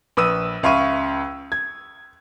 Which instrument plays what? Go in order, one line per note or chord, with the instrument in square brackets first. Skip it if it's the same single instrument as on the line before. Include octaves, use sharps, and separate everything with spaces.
[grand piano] A#1 B4 D#6 E6 D#7
C#2 E5 F5 B5 C#6 D#7
G#6